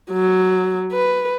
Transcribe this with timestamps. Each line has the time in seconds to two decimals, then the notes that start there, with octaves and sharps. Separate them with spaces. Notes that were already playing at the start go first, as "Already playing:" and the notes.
0.12 F#3
0.93 B4